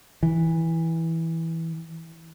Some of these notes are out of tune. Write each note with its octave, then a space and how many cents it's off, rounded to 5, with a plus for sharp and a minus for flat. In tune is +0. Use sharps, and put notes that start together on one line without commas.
E3 -10